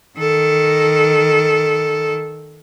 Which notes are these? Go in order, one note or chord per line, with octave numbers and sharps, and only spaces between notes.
D#3 A4